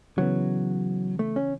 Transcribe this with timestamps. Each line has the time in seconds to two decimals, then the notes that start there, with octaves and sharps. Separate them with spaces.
0.17 C#3 E3 F#3 B3
1.19 A3
1.36 C#4